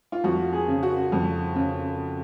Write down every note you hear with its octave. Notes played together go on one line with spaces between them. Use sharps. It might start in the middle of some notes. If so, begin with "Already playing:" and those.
F4
F2 F#4
G#4
C#3
F#4
F2
C#3